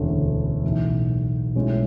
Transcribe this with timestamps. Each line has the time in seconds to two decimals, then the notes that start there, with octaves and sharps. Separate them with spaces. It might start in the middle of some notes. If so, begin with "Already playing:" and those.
Already playing: E1 D2 D3 A3 C#4
0.63 B1 A2 E3
1.55 B1 A2 G#3 C#4 E4